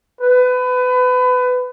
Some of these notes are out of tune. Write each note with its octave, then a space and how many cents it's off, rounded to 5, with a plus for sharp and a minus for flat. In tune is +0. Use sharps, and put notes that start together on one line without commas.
B4 +25